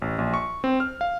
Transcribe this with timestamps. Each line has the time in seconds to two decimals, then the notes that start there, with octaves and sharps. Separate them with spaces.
0.02 A1
0.18 A#1
0.34 C#6
0.64 C4
0.80 F6
1.01 F5